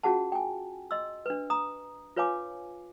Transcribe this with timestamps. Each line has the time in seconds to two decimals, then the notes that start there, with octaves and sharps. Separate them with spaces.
0.03 C#4 F4 F#4 G#4 F#5 A5
0.32 G5 G#5
0.91 D#5 C6 E6
1.26 D4 B4
1.50 A#5 D#6
2.16 F4 B4 C#5 F5 G#5 D6